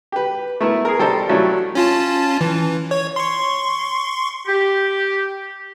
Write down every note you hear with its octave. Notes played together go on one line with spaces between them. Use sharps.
G4 B4
A3 B3 E4 A#4
G#4 A#4
G3 A4 C5 D#5
F#3 G3 A3 C#4 E4 F4
C#4 F4 A5
E3
C#5
C6 C#6
G4